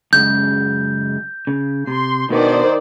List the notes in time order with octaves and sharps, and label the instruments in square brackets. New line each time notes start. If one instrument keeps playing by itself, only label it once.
[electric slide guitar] F#2 C#3 G#3 [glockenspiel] G6
[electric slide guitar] C#3
[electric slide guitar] C3 [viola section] C6
[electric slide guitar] B2 B3 D4 [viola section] D#3 C5 D5